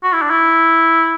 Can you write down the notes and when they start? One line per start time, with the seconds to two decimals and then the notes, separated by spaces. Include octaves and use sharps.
0.03 F#4
0.13 E4
0.22 D4
0.30 E4